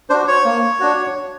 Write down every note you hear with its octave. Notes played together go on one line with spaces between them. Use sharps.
D4 F#4 C5
C#5
A#3
D4 F#4